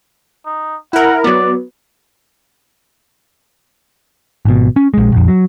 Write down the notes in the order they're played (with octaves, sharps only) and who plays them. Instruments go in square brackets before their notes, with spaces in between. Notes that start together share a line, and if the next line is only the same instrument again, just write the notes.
[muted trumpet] D#4
[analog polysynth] E4 A#4 [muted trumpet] F#5
[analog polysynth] F#3 B3 [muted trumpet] D5
[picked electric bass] G#1 B2
C#4
A#1 G#3
A#1 F2
F#3